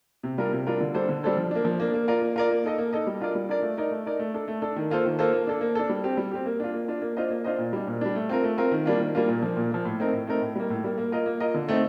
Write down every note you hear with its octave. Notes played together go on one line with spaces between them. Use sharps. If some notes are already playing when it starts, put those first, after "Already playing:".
C3
G3 D4 F4 A#4
C3
G3 D4 F4 A#4
D3
G3 D4 A4 C5
D3
G3 D4 A4 C5
F3
A#3 D4
F3
A#3 D4
A#3
F4 A#4 D5
A#3
F4 A#4 D5
A#3
D#4 A4 D#5
A#3
D#4 A4 D#5
G3
D4 F4 A#4 D5
G3
D4 F4 A#4 D5
A3
D#4 A#4 D5
A3
D#4 A#4 D5
A3
D4 A4
A3
D4 A4
D#3
A#3 F4 A4 C5
D#3
A#3 F4 A4 C5
A#3
D4 A4
A#3
D4 A4
G3
C4 G4
G3
C4 G4
A#3
D4 F4
A#3
D4 F4
A#3
D4 F4 C5 D#5
A#3
D4 F4 C5 D#5
A#2
G3 D4
A#2
G3 D4
A3
C4 F4 A#4
A3
C4 F4 A#4
D#3
G3 A#3 D4 F4
D#3
G3 A#3 D4 F4
A#2
F3 A#3
A#2
F3 A#3
A2
A3 C4 D#4 A#4
A2
A3 C4 D#4 A#4
A2
G3 A#3
A2
G3 A#3
A#3
F4 A#4 D#5
A#3
F4 A#4 D#5
D3
A3 C4 D#4